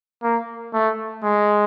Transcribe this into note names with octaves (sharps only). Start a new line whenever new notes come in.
A#3
A3
G#3